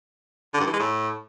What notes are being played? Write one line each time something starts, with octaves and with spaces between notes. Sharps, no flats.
D3
G2
E3
G#3
A2